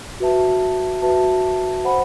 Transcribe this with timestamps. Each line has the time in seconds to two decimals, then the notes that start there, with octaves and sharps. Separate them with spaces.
0.20 F#4 B4 E5 A5
1.02 F#4 B4 E5 A5
1.85 C5 F#5 B5